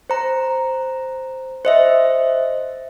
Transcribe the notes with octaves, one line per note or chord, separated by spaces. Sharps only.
C5 A#5
C5 D#5 E5